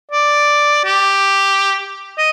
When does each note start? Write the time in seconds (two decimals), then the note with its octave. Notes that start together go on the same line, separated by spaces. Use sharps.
0.11 D5
0.85 G4
2.18 D#5